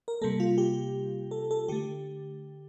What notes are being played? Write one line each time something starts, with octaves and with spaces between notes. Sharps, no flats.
A#4
C3 G3 A#3 A4
F4
G4
A4
A4
D3 A3 G4